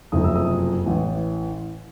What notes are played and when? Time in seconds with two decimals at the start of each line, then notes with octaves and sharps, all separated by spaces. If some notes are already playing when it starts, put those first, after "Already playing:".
0.12 F#1 F2 C3 F3 A3 D#6
0.24 E6
0.35 D#6
0.85 A1 A2 E3